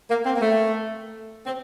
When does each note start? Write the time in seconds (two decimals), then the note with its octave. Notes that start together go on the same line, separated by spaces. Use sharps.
0.10 A#3
0.25 C4
0.35 A#3
0.41 A3
1.46 C4